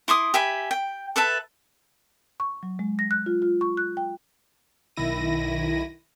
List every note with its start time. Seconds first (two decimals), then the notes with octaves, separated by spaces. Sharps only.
0.08 E4 C6 D6 D#6
0.34 G4 E5 G#5 B5
0.71 G5
1.16 A4 B4 E5 A5
2.40 C#6
2.63 F#3
2.79 G#3
2.99 A#6
3.11 F#6
3.26 F4
3.42 F4
3.61 C#6
3.77 F#6
3.97 G5
4.97 B1 D#3 E4 A#6 D#7